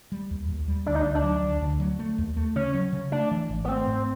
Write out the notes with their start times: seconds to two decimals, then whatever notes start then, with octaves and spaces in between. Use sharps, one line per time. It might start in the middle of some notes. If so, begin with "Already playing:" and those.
0.12 G3
0.31 D#2
0.49 D#2
0.68 G3
0.86 D2 D4
0.95 D#4
1.02 D4
1.05 D2
1.15 D4
1.24 F#3
1.43 D2
1.61 D2
1.80 F#3
1.99 A3
2.18 D#2
2.37 A3
2.56 C#3 C#4
2.74 F#3
2.93 C#3
3.12 A3 D4
3.31 E3
3.49 G#1
3.65 B3
3.68 A3 C4
3.87 G#2